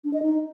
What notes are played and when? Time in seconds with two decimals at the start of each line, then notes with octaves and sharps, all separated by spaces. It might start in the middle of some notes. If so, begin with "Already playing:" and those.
0.04 D4
0.13 D#5
0.22 D#4